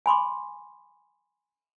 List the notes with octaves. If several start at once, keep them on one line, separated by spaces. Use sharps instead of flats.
G#5 B5 C6 D6